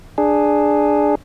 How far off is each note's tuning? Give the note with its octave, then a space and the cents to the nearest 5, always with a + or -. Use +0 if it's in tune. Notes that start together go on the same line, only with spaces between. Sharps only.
D4 +10 G#4 +0